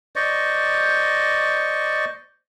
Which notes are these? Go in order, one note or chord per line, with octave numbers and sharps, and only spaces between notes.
C5 D5 D#5 C#6